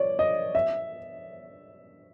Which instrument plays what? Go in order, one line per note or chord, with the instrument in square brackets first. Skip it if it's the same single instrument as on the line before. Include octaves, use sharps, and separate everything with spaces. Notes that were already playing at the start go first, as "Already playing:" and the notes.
Already playing: [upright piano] C#5 D5
D#5
E5